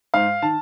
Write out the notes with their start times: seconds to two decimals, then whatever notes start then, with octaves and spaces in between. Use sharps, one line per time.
0.14 G#2 F5
0.42 D#3 A5